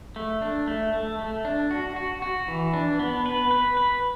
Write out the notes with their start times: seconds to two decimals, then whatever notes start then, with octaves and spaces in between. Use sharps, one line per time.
0.16 A3
0.42 D4
0.68 A3
0.93 A3
1.19 A3
1.45 D4
1.71 F#4
1.96 F#4
2.22 F#4
2.48 E3
2.73 D4
2.99 B3
3.26 B4
3.51 B4
3.77 B4